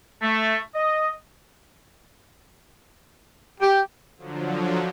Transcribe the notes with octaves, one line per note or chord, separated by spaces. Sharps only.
A3
D#5
G4
D3 F3 F#3